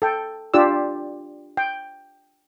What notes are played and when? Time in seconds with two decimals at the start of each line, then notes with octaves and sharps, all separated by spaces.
0.02 A4 G5
0.54 D4 F4 G4 D5 E6
1.57 G5